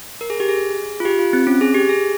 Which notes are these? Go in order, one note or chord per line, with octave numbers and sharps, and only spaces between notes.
A#4
G#4
G4
G#4
F4
G4
F4
C4
C#4
G#4
G4
G#4